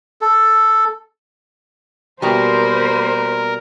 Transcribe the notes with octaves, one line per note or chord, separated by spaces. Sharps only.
A4
B2 G3 A#3 A#4 C5 B5